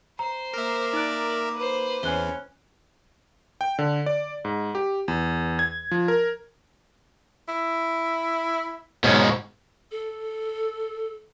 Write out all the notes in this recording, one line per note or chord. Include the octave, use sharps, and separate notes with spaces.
C5 A#5
A#3 A#4 E5 D6
D#4 D5 F#6
B4 C5
E2 E3 C#4 G#5 F#6 G7
G5
D3
D5
G#2
G4
E2
G#6
F3
A#4
E4
G#2 B2 C#4
A4